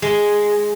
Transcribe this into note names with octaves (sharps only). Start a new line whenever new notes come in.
G#3